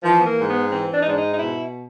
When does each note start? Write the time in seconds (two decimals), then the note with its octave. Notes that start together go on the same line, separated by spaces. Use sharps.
0.03 E3 F3
0.21 B3
0.26 A#3
0.38 G#2
0.49 B3
0.71 E3 C4
0.94 D4
1.01 D#4
1.05 G#2 D4
1.17 D#4
1.34 D#4
1.38 B2 E4